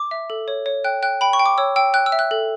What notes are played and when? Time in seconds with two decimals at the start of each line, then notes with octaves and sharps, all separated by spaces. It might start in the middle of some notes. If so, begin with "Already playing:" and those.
Already playing: D6
0.11 E5
0.30 A4
0.48 C#5
0.66 C#5
0.84 G5 F#6
1.03 G5 F#6
1.21 G5 B5
1.33 C#6
1.39 G5
1.46 D6
1.58 C#5 E6
1.76 G5 E6
1.94 G5 F#6
2.06 E6
2.12 E5
2.19 F#6
2.31 A4